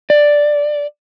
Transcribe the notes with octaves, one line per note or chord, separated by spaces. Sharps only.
D5